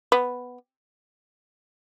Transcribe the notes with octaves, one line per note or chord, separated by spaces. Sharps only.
B3